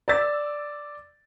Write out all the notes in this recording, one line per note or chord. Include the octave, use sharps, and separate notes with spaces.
D5 E6 A6